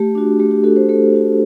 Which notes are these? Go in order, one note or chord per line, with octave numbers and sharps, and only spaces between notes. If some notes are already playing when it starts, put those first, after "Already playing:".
Already playing: A3 G4
D4 F#4
A3 G4
G4
D4 F#4 A4
C5
A3 A4
D4 F#4